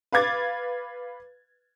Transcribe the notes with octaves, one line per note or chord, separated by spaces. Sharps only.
B4 F5 D6 G#6 A6